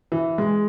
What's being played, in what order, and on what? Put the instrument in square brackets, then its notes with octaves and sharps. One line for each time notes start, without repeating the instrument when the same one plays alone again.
[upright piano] E3
G#3